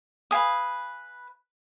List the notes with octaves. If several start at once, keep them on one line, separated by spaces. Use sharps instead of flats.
B4 F5 G#5 D#6